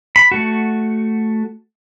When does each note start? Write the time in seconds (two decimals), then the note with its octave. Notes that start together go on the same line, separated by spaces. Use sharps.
0.16 B5
0.32 A3 F#4